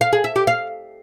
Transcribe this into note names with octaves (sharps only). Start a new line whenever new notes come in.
F5
G#4
E5
G4
F5